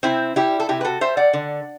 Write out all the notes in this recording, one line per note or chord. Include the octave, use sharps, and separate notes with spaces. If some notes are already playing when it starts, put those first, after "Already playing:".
C3 C4 E4
G3 E4 G4
A4
C3 E4 G4
B4
F#4 A4
G3 C5 E5
D5 F#5
D3